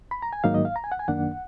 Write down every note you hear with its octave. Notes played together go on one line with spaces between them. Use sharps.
B5
A#5
G#5
G#2 D#3 F#3 A#3 D#4 F5
D#5
F5
A#5
G#5
F#5
G#5
F#2 D#3 A#3 D4 F#5